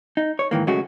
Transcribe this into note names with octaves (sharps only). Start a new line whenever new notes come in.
D#4
C#5
G#2 D#3 E3 A#3
C#3 F#3 G#3 A3 C#4 F#4